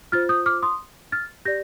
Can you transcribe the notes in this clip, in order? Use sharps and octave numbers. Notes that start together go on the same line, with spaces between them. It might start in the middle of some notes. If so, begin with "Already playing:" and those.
F4 C5 F6 A6
D#6 G6
D6 F6
C6 D#6
F6 A6
G4 D5 G6 A#6